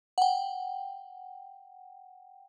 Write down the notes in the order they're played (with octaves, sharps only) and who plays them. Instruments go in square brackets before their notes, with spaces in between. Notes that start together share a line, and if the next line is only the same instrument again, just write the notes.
[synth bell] F#5 G5